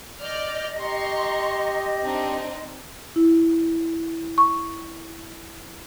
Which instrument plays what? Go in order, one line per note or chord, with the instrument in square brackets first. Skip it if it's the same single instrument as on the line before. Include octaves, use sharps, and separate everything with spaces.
[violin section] D5 F6 G6 [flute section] D#5
[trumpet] G4 [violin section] A#5 C6 C#6
[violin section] C4 D4 D#4
[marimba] E4
C#6